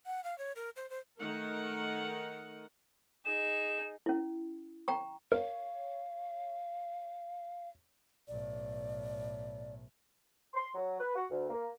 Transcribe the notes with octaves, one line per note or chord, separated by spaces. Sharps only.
F#5
F5
C#5
A#4
C5
C5
D#3 A3 D#4 A#4 F#5
D#4 G#4 E7
C#4 E4
G5 A#5 C#6
A#4 C#5 F5
B1 A2 D5
C6
F#3
B4
F#4
D2
A#3